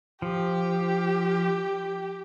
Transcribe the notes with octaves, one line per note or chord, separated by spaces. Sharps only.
F3 G4